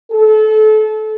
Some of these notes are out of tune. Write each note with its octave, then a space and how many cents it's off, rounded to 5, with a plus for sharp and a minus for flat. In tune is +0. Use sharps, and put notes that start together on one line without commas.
A4 -30